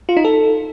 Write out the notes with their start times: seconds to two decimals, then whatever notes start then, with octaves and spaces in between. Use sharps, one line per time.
0.09 F4
0.17 D#4
0.24 A4